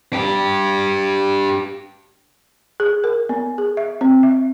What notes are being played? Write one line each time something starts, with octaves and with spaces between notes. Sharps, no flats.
D4 G4
G#4
A#4
B3
G#4
E5
C4
E5